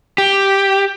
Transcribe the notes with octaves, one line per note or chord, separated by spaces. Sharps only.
G4